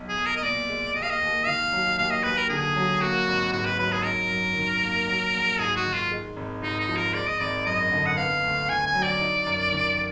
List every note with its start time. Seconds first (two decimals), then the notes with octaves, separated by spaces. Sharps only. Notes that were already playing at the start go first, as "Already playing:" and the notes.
Already playing: B1
0.09 G#4
0.18 B1
0.26 A#4
0.36 D#5
0.43 A#2 D5
0.69 G#3
0.95 D#2 D#5
1.03 F5
1.10 D#5
1.21 D#2
1.47 D#3 F5
1.72 F#3
1.97 D#2 F5
2.11 D#5
2.23 D#2 B4
2.37 A#4
2.49 D3 G#4
2.76 F#3
3.01 A#3 F#4
3.27 G#1
3.53 G#2 F#4
3.66 B4
3.79 F#3 B4
3.92 G#4
4.04 D#4 A#4
4.30 F#2
4.56 D#3
4.83 A#3
5.08 F#3
5.33 A#1
5.59 G#2 G#4
5.76 F#4
5.85 D#3
5.94 F4
6.11 G#3
6.36 G#1
6.62 G#2 D#4
6.79 D#4
6.88 F3
6.97 A#4
7.14 G#3 D5
7.27 D#5
7.40 G#1 D5
7.65 F#2 D#5
7.92 D3
8.06 F#5
8.17 B3 F5
8.44 D2
8.69 D3 G#5
8.86 G#5
8.95 F#3
9.03 D5
9.21 D#4
9.46 F#2
9.72 D#3